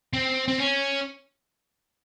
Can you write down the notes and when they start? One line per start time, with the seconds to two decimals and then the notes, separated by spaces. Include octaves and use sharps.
0.13 C4
0.48 C4
0.59 C#4